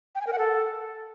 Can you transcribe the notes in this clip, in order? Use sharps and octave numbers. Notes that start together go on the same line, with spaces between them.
G5
G#5
A#4
F#5
A4